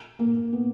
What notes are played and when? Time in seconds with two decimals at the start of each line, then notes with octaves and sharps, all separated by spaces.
0.19 A#3
0.53 B3